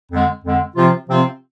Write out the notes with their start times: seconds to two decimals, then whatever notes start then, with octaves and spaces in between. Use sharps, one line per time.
0.11 F2 D3 G#3
0.44 F2 D3 G#3
0.76 C3 F3 C4 F4
1.08 C3 F3 C4 F4